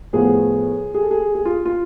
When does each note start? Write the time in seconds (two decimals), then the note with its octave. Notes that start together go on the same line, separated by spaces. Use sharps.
0.13 A2 F3 B3 G#4
0.94 G#4
1.03 A4
1.11 G#4
1.35 G#4
1.45 F4
1.65 F4